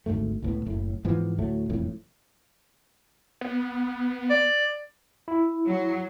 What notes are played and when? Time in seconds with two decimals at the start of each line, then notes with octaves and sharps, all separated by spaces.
0.06 G#1 D2 G#2 A3
0.42 C#2 A2 B3
0.67 F#1 A2
1.05 G#2 E3 F3 B3
1.39 D2 A2 F#3 A3
1.69 E1 F2 A2
3.41 B3
4.30 D5
5.28 E4
5.67 F#3